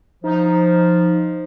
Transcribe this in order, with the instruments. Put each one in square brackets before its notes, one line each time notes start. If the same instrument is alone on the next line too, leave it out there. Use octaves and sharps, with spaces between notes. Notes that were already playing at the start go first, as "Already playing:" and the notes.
[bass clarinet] F3 [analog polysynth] D#4